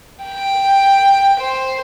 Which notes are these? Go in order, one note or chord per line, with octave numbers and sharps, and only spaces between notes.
G5
C5